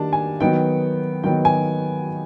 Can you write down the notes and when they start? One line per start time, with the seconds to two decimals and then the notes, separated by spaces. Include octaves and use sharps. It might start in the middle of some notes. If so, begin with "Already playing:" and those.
Already playing: D#3 G3 A#3 D4 A5
0.13 G#5
0.40 D#3 F#3 B3 D#4 G5
1.24 D#3 F#3 B3 D#4 G5
1.45 G#5